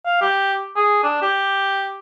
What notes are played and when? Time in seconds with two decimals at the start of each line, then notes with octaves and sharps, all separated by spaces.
0.05 F5
0.21 G4
0.76 G#4
1.04 D4
1.22 G4